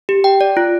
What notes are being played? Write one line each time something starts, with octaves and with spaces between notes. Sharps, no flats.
G4
G5
D5
F4